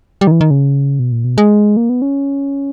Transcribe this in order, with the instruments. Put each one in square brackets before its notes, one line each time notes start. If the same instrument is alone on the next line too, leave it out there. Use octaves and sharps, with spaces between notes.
[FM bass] G3
D#3
E3
D#3
C#3
B2
A#2
B2
G#3
A#3
B3
C#4